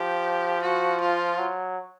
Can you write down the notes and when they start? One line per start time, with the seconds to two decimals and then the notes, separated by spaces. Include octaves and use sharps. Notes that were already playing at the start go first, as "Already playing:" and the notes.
Already playing: F3 G4
0.62 F#4
1.01 F4
1.38 F#3